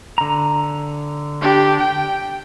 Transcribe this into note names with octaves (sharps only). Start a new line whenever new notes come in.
D3 A#5
D4 G4
G5